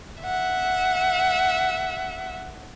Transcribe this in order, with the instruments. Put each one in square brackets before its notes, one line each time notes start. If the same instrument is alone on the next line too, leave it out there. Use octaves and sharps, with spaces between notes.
[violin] E5 F#5